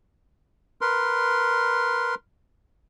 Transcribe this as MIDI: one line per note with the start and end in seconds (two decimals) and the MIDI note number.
0.81 2.15 70
0.81 2.15 71
0.81 2.15 84